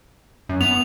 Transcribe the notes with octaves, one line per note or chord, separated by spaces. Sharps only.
F#2
B3 F7